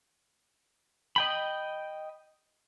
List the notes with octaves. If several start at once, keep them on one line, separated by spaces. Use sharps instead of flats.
D#5 G5 B5